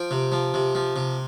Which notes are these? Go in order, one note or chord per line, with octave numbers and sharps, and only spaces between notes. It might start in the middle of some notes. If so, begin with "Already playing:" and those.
Already playing: F3 G5
C3
F3
C3
F3
C3